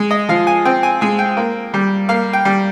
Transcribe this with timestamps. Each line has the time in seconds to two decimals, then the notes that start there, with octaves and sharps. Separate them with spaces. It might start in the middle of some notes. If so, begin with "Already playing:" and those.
Already playing: G#3
0.11 D#5
0.29 F3 F5
0.47 G#5
0.65 C4 G5
0.83 G#5
1.01 G#3 G#5
1.19 G5
1.37 A#3
1.74 G3
2.09 A#3 F5
2.33 G5
2.45 G3